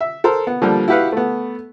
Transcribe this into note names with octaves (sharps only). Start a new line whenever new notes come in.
E5
A4 A#4 C5
B3
D3 F3 G3 A#3
E4 F#4 G4 B4 F5 F#5
A3 B3